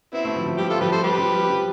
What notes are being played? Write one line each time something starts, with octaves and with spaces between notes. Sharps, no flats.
B3 C4 E4
A3
F3
F3
G3 E4 G4
F4 A4
F3 G4 B4
A4 C5
G3 G4 B4
F3
G3
F3